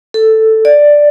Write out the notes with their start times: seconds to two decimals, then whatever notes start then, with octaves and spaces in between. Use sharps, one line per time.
0.14 A4
0.65 D5